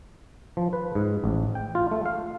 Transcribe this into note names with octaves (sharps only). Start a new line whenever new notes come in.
F3
B4
G#2
A1
G5
F4
A3
F5